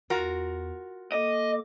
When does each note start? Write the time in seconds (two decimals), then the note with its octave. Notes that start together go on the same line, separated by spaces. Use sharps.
0.10 E2 F4 F#4 A#4
1.12 A#3 A4 D#5 D6